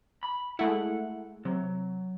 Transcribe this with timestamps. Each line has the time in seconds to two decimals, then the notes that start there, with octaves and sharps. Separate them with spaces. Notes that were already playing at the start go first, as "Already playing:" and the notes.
0.23 B5
0.59 G#3 A3 E4 F#5
1.45 C3 F#3